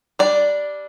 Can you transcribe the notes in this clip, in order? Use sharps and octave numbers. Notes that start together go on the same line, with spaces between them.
G3 D4 D5